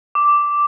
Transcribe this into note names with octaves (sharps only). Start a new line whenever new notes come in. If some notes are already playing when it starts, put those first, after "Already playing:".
D6